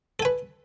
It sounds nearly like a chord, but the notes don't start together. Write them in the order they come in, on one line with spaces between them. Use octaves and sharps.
A4 G#5 B4